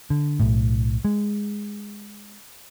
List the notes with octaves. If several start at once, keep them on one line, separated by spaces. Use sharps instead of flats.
D3
B1 A2
G#3